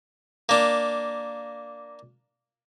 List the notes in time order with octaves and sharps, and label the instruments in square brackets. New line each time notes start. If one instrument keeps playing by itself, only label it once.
[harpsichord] A#3 D4